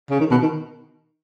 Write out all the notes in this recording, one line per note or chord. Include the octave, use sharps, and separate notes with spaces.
C#3
D#3
B2
D#3